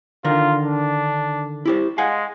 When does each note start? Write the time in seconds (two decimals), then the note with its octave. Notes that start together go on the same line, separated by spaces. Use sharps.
0.24 D3 D#3 F4 A#4
0.64 D4
1.65 E4 G4 C5
1.98 G#3 F5 F#5 G#5